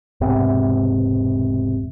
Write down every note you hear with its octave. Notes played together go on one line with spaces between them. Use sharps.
E1 G#2 C3 B3